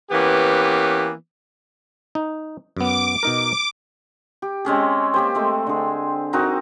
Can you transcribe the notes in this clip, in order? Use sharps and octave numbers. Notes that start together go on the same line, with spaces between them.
E3 A#3 B3 C#4 G4
D#4
F#2 B3 D6
B2 D#4 A#4
G4
G#3 C4 C#4 G#4
A#3 G4 C5
G#3 A3 C4
D3 G#4
C4 D#4 F#4 A#4